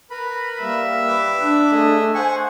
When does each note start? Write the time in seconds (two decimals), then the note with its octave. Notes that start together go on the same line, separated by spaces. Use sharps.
0.10 A#4 B4 B5
0.61 G3 A#3 E5
1.08 B4 D6
1.40 D4
1.72 A3 G#4 D#5
2.14 C5 F#5 G#5 C#6